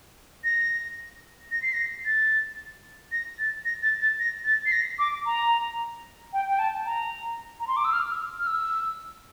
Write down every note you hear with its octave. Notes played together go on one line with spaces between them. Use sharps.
A#6
A#6
C7
A#6
A6
A#6
A6
A#6
A6
A6
A#6
A6
C7
A#6
D6
A#5
G5
G5
A5
A#5
A#5
C6
D6
E6
F6
E6
F6
E6